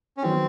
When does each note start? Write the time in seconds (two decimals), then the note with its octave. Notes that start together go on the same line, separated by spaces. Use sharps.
0.17 C#4
0.22 D#3 F#3 B3 C4 D#4